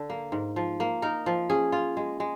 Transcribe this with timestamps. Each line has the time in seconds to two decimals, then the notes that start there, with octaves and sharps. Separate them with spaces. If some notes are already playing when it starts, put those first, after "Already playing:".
Already playing: D3
0.10 A#3
0.32 G#2
0.56 F3
0.80 A#3
1.02 D#4 A#4
1.26 F3
1.50 C#4 G#4
1.72 F4
1.97 G#3
2.20 G#3